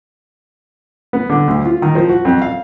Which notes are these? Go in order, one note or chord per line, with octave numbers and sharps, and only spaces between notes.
B3
D3
D2
F4
D#3
F3
F#4
F2
F5